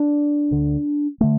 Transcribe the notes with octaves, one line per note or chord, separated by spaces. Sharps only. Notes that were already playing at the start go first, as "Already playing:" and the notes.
Already playing: D4
D2 D3
D3 A3